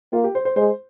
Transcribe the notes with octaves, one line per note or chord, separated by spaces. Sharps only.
A#3 F4
G4
C5
C5
G#3 C5